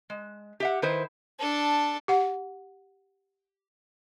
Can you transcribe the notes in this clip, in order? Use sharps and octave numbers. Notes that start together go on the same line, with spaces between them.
G#3
G4 E5 F#5
D#3 E4 B4 C5
D4 A4
G4 F#5